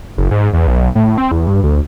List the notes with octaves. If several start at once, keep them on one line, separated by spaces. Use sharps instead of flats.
F#1
G#2
E2
B1
A2
C4
E2
G2
D2